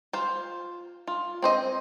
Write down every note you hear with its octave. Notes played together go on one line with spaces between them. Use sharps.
F4 C5
F4
C4 C5 D#5